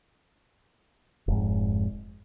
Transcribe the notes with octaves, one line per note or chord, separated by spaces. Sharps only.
F1 G#2